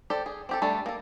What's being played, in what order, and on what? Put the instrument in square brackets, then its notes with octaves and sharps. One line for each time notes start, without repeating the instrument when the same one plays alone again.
[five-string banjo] G4 A4 C5 D5
G#4
C4 G4 A4
G3 A3 D4 A4
A#3 A4